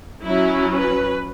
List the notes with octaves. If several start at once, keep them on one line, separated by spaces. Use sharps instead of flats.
F#3 C#4 E4
B4